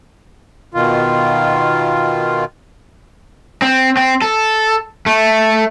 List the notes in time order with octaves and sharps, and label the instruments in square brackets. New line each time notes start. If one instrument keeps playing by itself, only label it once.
[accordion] B2 D#3 F4
[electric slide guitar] C4
C4
A4
A3